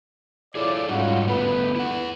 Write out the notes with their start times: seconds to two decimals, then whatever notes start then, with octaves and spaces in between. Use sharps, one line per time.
0.55 E4 F4 G#4 A4 C#5 D5
0.89 G#2 G3 C#4 D#4 F4 F#4
1.27 G1 A3 B3 B4
1.76 E4 F#5